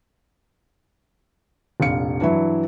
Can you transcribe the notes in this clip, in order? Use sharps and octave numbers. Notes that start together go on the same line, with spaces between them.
F1 A#1 F5 C#7
G2 E3 F#3 E4